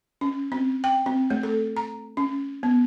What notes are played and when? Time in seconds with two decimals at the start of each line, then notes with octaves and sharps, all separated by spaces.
0.21 C#4
0.52 C4
0.84 G5
1.06 C4
1.30 A3
1.43 A4
1.77 A#5
2.17 C#4
2.63 B3